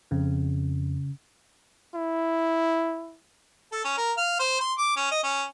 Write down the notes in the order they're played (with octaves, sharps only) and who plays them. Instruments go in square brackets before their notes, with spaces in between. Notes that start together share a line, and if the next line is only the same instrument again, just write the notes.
[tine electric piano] F2 [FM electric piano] C#3
[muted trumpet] E4
[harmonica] A4
C#4
A#4
F5
C5
C6
D6
C#4
D#5
C#4